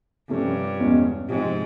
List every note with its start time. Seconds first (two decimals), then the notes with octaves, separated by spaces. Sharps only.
0.30 G2 C3 F3 A3 C#4
0.79 E2 B2 G#3 C#4
1.29 G#2 C3 F3 G#3 C4